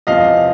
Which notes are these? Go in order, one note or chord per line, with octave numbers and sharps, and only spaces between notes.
E2 C3 F3 D#5 F5